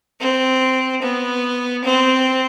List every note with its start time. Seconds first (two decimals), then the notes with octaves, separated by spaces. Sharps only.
0.20 C4
1.02 B3
1.84 C4